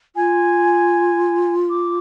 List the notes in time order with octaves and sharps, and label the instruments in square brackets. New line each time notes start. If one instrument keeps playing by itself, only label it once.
[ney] F4 [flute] G#5
[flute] D6